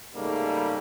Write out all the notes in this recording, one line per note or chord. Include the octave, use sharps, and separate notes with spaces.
G#2 C#3 G3 A3 A#3